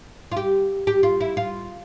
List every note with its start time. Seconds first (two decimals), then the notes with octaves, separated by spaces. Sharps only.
0.31 F4
0.37 G4
0.87 G4
1.03 F4
1.21 E4
1.37 F4